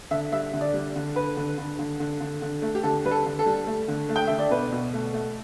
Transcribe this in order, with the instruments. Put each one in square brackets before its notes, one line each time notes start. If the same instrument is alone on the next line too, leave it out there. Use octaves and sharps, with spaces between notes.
[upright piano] D3 E5
G3 E5
D3
D5
G3
D3
D3 B4
D3
D3
D3
D3
D3
D3
A3
G4
D3 A4
G3 B4
A4
D3
A4
G3
A3
D3
A3
G5
D3 E5
D5
B2 B4
B2
A3
A3